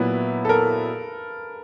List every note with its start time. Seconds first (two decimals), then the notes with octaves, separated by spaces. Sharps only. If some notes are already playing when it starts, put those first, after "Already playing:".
Already playing: A#2 F#3 B3 E4 B4
0.45 A4
0.49 A#4